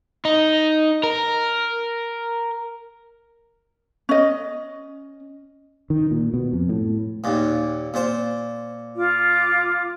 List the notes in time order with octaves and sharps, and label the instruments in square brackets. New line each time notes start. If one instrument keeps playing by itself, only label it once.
[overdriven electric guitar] D#4
A#4
[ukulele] C#4 D#5
[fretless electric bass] D#3
A#2
B2
F2
A2
[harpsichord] D#2 A#2
A#2 C5
[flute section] F4 D6